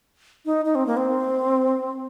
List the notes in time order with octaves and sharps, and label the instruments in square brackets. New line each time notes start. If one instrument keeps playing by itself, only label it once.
[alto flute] D#4
D#4
C4
A#3
C4